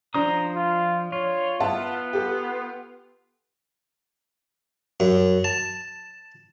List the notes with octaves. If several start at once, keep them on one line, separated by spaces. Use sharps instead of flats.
F3 D4 C5 A#5 D#6
F4
F4 C#5
B3 E5 F#5 A5
G4 A4
F#2
A5